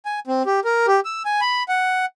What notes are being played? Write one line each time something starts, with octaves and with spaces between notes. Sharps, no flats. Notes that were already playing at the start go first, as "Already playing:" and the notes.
G#5
C4
G4
A#4
G4
E6
G#5
B5
F#5